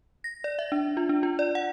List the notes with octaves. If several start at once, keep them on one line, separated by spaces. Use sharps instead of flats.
A#6
D5
E5
D4
F4
D4
F4
D5
F#5